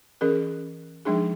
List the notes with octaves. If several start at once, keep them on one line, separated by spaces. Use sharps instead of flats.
E3 C#4 G#4 A#4
F3 G#3 D4 D#4 G#4